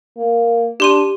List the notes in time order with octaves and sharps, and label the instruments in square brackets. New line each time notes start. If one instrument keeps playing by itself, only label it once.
[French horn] A#3
[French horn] D4 [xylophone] G4 C6 D#7